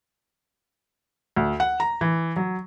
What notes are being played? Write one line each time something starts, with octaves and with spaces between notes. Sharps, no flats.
D2
F#5
A#5
E3
F#3